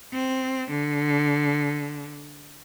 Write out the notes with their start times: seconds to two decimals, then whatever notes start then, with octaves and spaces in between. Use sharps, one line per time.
0.14 C4
0.71 D3